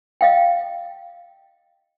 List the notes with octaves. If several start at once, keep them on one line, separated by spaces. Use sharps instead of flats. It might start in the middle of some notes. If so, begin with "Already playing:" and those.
D#5 F5 G5